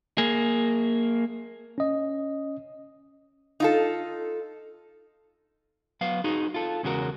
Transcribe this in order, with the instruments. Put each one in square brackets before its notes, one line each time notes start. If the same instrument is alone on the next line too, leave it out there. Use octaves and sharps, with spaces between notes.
[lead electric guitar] A#3 G#4
[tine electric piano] C#4 D#5
[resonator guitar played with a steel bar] D#4 F4 A4
[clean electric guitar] F#3 B3 F5
D#4 F#4 G#4
F4 A4
E2 C#3 G#3 F#4 A#4